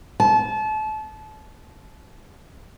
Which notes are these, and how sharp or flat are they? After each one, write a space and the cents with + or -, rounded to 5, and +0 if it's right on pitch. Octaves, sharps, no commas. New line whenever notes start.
A5 -30